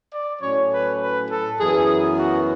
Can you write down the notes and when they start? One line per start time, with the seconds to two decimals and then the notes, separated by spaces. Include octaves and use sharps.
0.11 D5
0.41 A2 F#3 C#4 C#5
0.71 B4
1.00 B4
1.29 A4
1.59 F#2 E3 B3 G#4
2.19 F#4